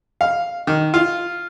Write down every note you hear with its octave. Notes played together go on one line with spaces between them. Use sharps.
F5
D#3
F4